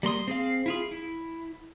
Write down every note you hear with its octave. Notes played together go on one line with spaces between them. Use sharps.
G3 A#3 C6 D#6
C4 G#4 F5
E4 F4 G#4
E4